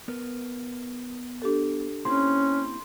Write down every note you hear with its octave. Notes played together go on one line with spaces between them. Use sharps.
B3 A#4 B4
D4 G4 A4
A#3 C4 C#4 E4 C6